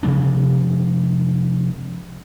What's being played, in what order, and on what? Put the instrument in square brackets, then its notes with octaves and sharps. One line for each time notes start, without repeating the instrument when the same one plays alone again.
[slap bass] C3 F3 G#3 D4